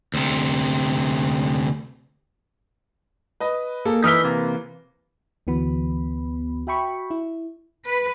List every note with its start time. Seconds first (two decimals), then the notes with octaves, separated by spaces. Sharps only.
0.14 D2 C3
3.40 B4 D#5
3.85 A#3 G#4 A4
4.04 E3 D#4 A#4 B4 E5 G7
4.24 C3 A#3
5.47 D2 E3 B3 F#4 B5
6.67 F#4 E5 G5 B5 C#6
7.11 E4
7.86 B4